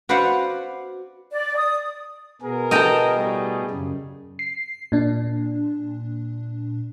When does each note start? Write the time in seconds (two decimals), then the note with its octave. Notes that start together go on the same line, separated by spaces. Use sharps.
0.09 F#4 B4 C5 D5 F5 F#5
1.31 D5
1.55 D#6
2.42 B2 B3 G#4 A#4
2.71 D3 E4 A4 D#5 G5 A#5
3.14 A2 G3 A3
3.70 F#2 C#3
4.39 C7
4.92 A#2 D4